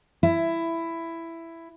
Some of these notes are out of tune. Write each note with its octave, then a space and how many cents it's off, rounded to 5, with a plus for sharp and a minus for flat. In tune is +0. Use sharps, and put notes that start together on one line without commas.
E4 +10